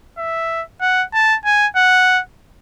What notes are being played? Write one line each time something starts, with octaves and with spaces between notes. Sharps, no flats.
E5
F#5
A5
G#5
F#5